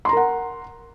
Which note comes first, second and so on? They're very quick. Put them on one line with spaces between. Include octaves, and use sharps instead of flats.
C6 A#5 A#4 F#5